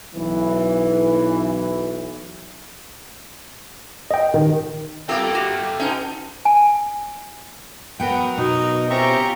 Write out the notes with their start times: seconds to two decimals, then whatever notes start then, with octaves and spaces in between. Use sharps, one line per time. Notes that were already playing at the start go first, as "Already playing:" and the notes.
0.15 B1 E3
4.11 D#5 G5
4.34 D#3
5.09 A3 A#3 C4 F4 G4 A4 G5
5.35 F#4 G4
5.80 B2 C#4 D#4
6.45 G#5
8.00 F#3 B3 A#4 F#5 G5
8.38 B2 D#4
8.90 C4 C#4 F4 G4 E5 A#5 C#6